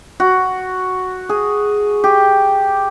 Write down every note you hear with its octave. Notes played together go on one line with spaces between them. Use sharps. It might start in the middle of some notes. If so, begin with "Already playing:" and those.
F#4
G#4
G4